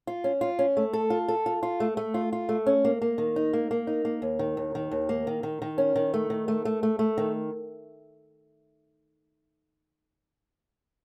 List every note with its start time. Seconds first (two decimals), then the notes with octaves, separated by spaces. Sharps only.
0.07 F4
0.24 C#4
0.41 F4
0.59 C#4
0.77 A3
0.93 A4
1.10 F4
1.28 A4
1.46 F4
1.63 F4
1.80 A3
1.97 A3
2.14 F4
2.33 F4
2.49 A3
2.66 C#4
2.85 A#3
3.02 A#3
3.18 D#3
3.36 D#4
3.53 A#3
3.71 A#3
3.87 D#4
4.05 A#3
4.22 D#2
4.39 D#3
4.57 D#2
4.75 D#3
4.91 D#2
5.09 A#3
5.27 D#3
5.43 D#3
5.62 D#3
5.78 C#4
5.96 D#3
6.14 A3
6.30 D#3
6.48 A3
6.65 A3
6.83 A3
6.99 A3
7.18 D#3